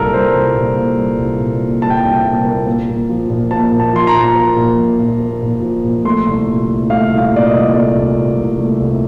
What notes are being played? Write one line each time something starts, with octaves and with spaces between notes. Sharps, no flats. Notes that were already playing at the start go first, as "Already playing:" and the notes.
Already playing: C2 A#2 G3 A#3 A4 A#4
G3 C5
C2
A#2
A#3
G3
C2
A#2
A#3
G3 A5
G5
A5
C2
A#2
A#3
A#3
A#2
F3
A#2
A#3 A5
A#2
A5
F3 C6
A#5
A#2
A#3
A#2
F3
A#2
A#3
A#2
F3
A#2
A3 C6
C2
A#2
C2
A3 F5
C2
F5
A#2 D5
D#5
C2
A3 D5
C2
A#2
C2
A3
C2